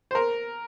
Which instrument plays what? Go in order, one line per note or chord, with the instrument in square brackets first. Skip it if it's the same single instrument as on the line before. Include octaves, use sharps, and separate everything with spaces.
[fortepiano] C5
A#4